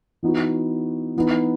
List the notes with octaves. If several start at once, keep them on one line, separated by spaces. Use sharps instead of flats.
E3 B3 D#4 F#4
E3 B3 D#4